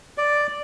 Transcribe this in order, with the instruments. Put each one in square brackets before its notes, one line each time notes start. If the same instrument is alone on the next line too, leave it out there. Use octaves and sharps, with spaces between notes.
[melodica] D5